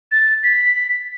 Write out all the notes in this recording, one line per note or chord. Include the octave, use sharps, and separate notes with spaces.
A6
B6